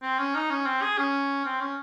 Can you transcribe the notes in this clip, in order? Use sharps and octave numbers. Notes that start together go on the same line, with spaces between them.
C4
C#4
D#4
C#4
C4
G#4
C#4
C4
C#4